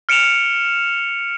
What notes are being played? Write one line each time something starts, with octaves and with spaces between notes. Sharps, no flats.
F6 C#7 D7 E7 F7